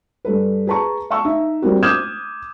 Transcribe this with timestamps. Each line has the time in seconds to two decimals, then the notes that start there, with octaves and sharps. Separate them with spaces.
0.25 G2 A4 B4
0.67 G#4 B4 A5 A#5 C#6
1.10 F5 A5 C#6 E6
1.24 D#4 E5
1.62 G3 A#3 C4 F#4
1.83 D6 D#6 F6 G6 G#6 E7